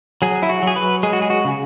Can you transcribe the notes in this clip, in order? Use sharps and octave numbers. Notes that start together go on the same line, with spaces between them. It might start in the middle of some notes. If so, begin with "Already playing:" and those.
F#3 G#4
E4
F#4
F#3 G#4
B4
G#3 G#4
F#4
G#4
F#4
C#3